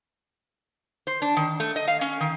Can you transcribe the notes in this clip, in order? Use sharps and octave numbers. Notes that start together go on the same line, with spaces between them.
C5
D4
D#3
A3
D#5
F5
C#4
D#3